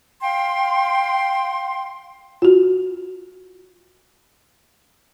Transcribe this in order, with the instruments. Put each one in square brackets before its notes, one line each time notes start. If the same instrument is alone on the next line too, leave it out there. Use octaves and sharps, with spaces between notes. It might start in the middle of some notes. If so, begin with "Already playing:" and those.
[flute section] F5 G5 C6
[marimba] F4 F#4